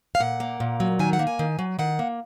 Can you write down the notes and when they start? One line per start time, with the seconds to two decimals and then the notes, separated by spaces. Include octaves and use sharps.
0.15 F5
0.20 A#2 F#5
0.40 A#3
0.60 A#2
0.80 F#3
0.99 D#3 G#5
1.13 F#5
1.19 A#3
1.27 G#5
1.39 D#3
1.59 F#3
1.79 D#3 F#5
1.99 A#3